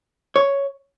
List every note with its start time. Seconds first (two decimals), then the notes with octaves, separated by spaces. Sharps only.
0.36 C#5